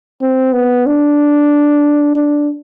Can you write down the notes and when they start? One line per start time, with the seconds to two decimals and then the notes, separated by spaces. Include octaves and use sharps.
0.21 C4
0.53 B3
0.86 D4
2.15 D4